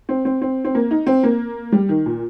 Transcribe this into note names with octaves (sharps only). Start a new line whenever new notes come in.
C4
C4
C4
C4
A#3
D#4
C4
A#3
G3
D#3
A#2